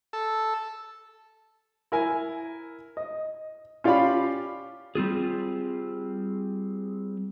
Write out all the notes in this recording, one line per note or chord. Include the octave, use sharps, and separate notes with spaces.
A4
E4 A#4 G#5
D#5
C#4 F4 G4 D5 F5 B5
G3 C4 F4 G#4